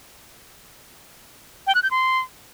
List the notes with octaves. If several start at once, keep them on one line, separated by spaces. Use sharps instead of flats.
G5
F#6
G6
C6